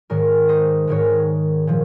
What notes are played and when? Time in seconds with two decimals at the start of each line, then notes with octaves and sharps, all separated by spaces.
0.10 G#2 D#3 G#3 A#4 C#5
0.49 C5 D#5
0.88 G#2 D#3 G#3 A#4 C#5
1.67 A#2 F3